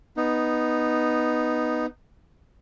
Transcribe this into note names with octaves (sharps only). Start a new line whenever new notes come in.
B3 D#4